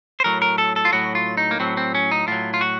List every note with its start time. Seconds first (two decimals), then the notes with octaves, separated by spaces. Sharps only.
0.20 C5
0.24 A2 F#3 A#4
0.42 A#4
0.58 A4
0.76 A4
0.85 F4
0.92 A2 F#3 F#4
1.15 F4
1.37 D#4
1.51 A#3
1.60 A2 F#3 C4
1.77 C4
1.95 C#4
2.11 D#4
2.27 A2 F#3 F4
2.54 F4
2.61 F#4